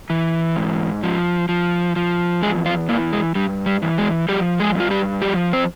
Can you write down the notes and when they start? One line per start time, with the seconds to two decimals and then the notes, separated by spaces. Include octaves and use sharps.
0.10 E3
0.56 G#2
1.03 F3
1.49 F3
1.96 F3
2.42 E2 G#3 G#4
2.66 F3 F4
2.88 A#2 E3 A#3
3.13 G#3
3.35 G2 G3
3.66 G3
3.82 E3
3.98 G#3
4.28 F3 G3 G4
4.60 G#3 G#4
4.75 G2 F4
4.91 G3 G4
5.22 F3 G3 G4
5.53 C4 C5